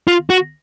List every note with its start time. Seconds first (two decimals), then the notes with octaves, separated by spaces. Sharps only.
0.08 F4
0.30 F#4